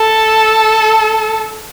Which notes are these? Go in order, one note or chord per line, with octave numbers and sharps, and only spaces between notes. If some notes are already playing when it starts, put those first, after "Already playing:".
Already playing: A4